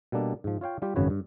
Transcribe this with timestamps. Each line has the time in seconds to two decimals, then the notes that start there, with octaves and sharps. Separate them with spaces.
0.12 B2 G3 A#3 D4 A4
0.44 G#2 F3
0.61 F4 C#5 F5 G5
0.82 G3 F4 G4
0.96 G#1 F#2 C#3 F#4 B4 C#5
1.10 G2